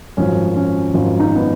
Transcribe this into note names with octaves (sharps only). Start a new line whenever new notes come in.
G#1 F#2 F3 C#4
C#4
G#1 F#2 F3 F4
D#4
B3